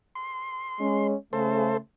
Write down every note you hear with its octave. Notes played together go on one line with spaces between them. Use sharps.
C6
G#3 C#4
C#3 A3 A4 C5